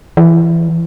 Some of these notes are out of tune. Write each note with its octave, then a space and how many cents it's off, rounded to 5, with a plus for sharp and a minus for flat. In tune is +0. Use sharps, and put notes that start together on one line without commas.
E3 +20